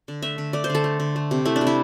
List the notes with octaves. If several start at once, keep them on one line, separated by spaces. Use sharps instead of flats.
D3
A3 E5
D3
A3 D5
C5
D3 A4
A3
D3
A3
C3
A3 E4
D4
C3
E4